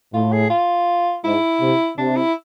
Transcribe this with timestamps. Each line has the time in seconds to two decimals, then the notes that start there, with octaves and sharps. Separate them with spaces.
0.13 A2 F4
0.32 G#4
0.50 F4
1.24 G#2 E4
1.61 C3
1.98 C3 D4
2.16 E4